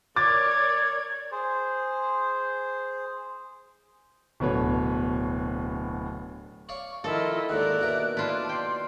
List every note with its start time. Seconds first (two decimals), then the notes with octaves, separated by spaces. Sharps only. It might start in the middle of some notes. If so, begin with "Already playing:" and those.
0.16 A#4 C#5 D5 D6 G#6 A6
1.32 G#4 C5
4.40 D1 B2 B4 C#5
6.69 C#5 D5 F5 C#6
7.04 D#3 F3 E4 F4 A4 A#4 D#5
7.49 D#2 G#2 D3 A#4 D5 F#6
7.79 D#2 B2 E5
8.17 E4 F4 D5 A5
8.49 G5 C6